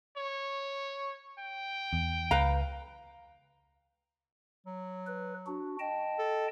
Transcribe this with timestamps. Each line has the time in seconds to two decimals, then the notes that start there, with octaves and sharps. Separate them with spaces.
0.17 C#5
1.39 G5
1.93 E2
2.31 C#2 B4 F5 A#5
4.67 F#3
5.06 B4
5.46 D4 F#4
5.79 D#5 G5 A5
6.19 A4